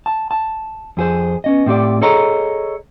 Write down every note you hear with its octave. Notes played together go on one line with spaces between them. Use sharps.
A5
A5
F2 G#4 C5
B3 C#4 D#5
A2 C4 G4 D5
G#4 A4 C#5 D#5 A#5